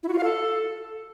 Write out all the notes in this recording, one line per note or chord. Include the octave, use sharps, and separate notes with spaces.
E4
F#4
F4
F5
A4